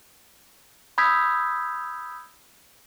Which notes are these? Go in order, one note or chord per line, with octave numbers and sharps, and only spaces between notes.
B5 D#6 E6 G6 G#6 B6